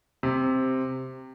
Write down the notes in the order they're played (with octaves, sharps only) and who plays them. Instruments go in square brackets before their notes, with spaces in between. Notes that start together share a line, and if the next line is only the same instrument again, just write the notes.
[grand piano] C3